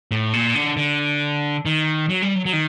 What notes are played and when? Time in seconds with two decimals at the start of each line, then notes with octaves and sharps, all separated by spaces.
0.11 A2
0.33 A#2
0.55 D3
0.77 D3
1.65 D#3
2.09 F#3
2.22 G3
2.35 F#3
2.46 F#3
2.53 D#3